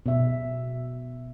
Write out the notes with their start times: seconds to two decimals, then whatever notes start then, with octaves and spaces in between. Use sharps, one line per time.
0.06 B2 E5